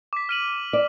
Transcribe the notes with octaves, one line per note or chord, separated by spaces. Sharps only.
D6 B6
F6 D#7 F#7
D5